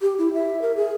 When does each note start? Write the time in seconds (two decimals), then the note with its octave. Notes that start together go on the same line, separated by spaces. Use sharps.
0.01 G4
0.19 E4
0.34 E5
0.62 A#4
0.76 G#4